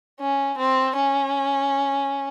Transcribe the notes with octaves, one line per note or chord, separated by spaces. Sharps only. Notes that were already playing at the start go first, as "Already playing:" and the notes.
C#4
C4
C#4